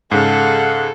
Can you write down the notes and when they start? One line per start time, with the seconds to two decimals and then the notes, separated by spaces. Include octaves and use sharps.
0.12 G#2 C#3 G#4 A4 F5 F#5